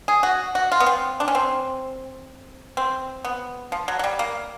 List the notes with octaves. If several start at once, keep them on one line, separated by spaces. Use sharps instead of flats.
G#4
F#4
F#4
F4
B3
C4
D4
C#4
C4
C4
B3
F3
F#3
F#3
G3
A#3